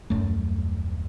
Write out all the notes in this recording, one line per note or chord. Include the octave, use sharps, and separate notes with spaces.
D#1 F#2 A3